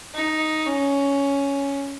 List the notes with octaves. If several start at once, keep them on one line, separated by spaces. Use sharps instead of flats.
D#4
C#4